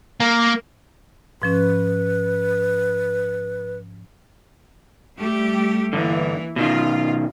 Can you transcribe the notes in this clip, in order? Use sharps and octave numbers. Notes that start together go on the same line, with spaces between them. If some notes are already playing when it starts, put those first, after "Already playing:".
A#3
G#2 F3 C#4 B4
G3 A3 G4
G2 D3 E3 A#3
B2 D#3 F4